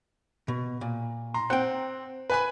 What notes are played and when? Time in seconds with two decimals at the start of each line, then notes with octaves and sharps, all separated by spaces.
0.48 B2
0.81 A#2
1.34 A#5 C6
1.50 C4 F#5 G5
2.30 B4 G#5 B5